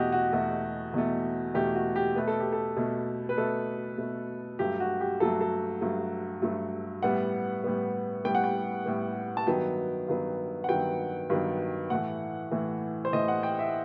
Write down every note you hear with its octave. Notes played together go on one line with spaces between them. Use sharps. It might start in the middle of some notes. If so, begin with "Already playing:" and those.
Already playing: E2 B2 A3 F#4 G4 D#5
F#4
E2 B2 A3
E2 B2 A3
E2 B2 A3 G4
F#4
G4
B2 A3 B4
A4
G4
A4
B2 A3
B4
B2 A3 A4
B2 A3
G2 F#3 A3 G4
F#4
G4
G2 F#3 A3 A4
A4
G2 F#3 A3
G2 F#3 A3
A2 G3 B3 F#5
A2 G3 B3
A2 G3 B3 G5
F#5
G5
A2 G3 B3
A5
G2 D#3 F#3 B3 G5
G2 D#3 F#3 B3
F#5
G2 D#3 F#3 B3 G5
G2 D#3 F#3 B3
A2 E3 A3 F#5
A2 E3 A3
C5
A2 E3 A3 D#5
F#5
G5
E5